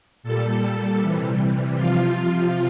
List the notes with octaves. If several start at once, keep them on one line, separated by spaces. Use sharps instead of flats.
A#2 G3 A4
C3 E3 G3
C3 F3 F4